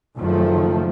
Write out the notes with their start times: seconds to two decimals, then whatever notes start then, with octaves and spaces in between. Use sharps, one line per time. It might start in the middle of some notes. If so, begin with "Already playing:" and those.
0.17 F#1 D#3 F3 A3